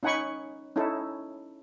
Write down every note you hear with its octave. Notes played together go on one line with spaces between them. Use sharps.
C#4 D#4 F#5 G#5 B5 C#6
C#4 D#4 E4 A4